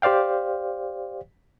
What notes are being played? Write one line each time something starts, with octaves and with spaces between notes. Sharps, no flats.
G4 C5 D5 F5 G5